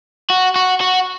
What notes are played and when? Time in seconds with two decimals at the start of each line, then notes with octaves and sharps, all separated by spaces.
0.30 F#4
0.56 F#4
0.81 F#4